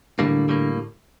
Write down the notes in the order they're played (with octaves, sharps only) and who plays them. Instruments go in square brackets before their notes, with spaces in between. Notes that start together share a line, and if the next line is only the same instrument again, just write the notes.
[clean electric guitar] A2 G3 A#3 [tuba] D3
[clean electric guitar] A2 G3 A#3